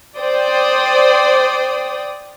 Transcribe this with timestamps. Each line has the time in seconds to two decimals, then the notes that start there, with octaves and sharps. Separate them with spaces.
0.18 C5 D5 G5 D#6